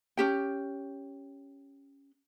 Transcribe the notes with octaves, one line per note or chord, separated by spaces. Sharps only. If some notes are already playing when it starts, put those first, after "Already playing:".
C#4 G4 G5